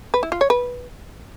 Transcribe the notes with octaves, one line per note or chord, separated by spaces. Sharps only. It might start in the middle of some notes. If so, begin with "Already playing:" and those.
B4
E4
F4
C#5
B4